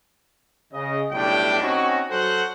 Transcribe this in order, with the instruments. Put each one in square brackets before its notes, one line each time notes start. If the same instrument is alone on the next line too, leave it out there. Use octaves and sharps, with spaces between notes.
[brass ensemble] C#3 D#5
B1 A2 G3 D4 G4 G5
C4 C#4 D#4 F#4
F#3 F#4 A4 C5 F#5